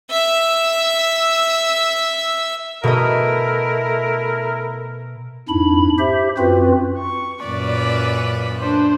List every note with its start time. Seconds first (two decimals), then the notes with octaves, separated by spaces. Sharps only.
0.10 E5 E6
2.83 B2 A3 E4 A#4 D#5
5.49 F2 G#2 D4 E4 B5
5.98 G4 C5 E5
6.38 F#2 C4 F4 F#4 B4
6.99 C#6
7.43 F#2 A#2 B4 D5
8.60 D4 C5